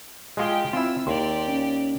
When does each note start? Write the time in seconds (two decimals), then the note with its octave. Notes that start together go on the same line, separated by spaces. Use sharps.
0.37 G#3 F4 G4 G#4 G5
0.73 C4 E4 F4 E6
1.07 D#2 G4 D5 C6
1.48 C#4